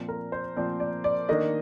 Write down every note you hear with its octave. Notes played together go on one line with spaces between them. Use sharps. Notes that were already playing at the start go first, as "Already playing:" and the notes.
Already playing: A#2 F3 C4
A#4
C5
A#2 F3 C4 D5
D5
D5
D#3 A#3 D4 D#5